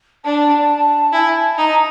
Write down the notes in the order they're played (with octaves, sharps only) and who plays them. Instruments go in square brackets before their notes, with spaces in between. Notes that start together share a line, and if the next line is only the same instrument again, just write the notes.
[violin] D4 [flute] A5
[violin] E4 [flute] G#5
[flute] A5
[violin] D#4 [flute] A#5